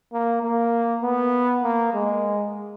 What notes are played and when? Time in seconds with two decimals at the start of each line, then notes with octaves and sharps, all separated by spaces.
0.13 A#3
0.43 A#3
1.02 B3
1.63 A#3
1.94 G#3